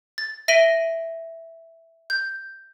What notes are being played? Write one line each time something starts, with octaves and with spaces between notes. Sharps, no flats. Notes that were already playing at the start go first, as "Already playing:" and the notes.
A6
E5 A#6 D7 D#7 F#7 G7
G6